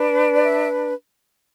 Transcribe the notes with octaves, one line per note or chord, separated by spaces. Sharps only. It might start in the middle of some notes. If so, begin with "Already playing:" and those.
Already playing: D4 B4
D5
E5